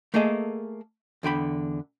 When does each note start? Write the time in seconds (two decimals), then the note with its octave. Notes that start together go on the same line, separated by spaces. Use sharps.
0.14 A3 A#3 G#4 A4 D#5
1.23 E2 D3 G5 B5